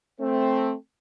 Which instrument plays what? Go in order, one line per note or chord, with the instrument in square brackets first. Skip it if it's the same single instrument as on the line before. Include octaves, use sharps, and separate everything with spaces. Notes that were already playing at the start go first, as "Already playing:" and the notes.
[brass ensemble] A3 C4